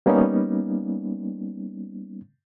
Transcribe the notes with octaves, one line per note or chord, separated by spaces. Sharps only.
G3 A#3 B3 C#4 D#4